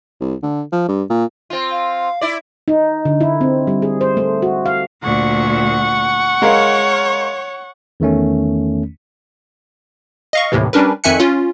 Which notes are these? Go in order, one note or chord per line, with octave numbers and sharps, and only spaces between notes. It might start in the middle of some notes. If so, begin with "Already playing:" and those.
C2
D3
F3
G2
A#2
C4 F4
F5
E4 D5
D#4
D3
E4
C4
G3
G#4
C5
A3
F#4
F5
D2 A#2 F#5 C#6
G#3 A#4 C#5 F5
E2 D#3 A3 C#4
D#5 F5 C#6
D#2 A2 C3 E3
G3 C#4 D4 A#4 B4
F2 D#3 E5 G#5 F#6 C#7
C#4 F4